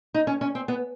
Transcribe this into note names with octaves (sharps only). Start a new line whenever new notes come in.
D#4
C#4
C#4
C4
B3